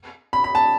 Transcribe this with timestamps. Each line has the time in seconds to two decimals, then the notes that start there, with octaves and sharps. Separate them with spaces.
0.33 B5
0.44 B5
0.55 A5